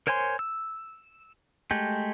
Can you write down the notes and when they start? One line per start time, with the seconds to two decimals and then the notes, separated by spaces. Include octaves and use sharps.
0.07 A#4 C5 C#5 G#5 C6
0.39 E6
1.71 G#3 A3 G4